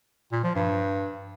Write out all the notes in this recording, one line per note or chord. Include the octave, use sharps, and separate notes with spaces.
A#2
F3
G2